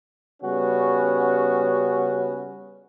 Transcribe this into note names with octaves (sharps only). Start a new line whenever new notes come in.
C#3 G3 B3 C#4 F#4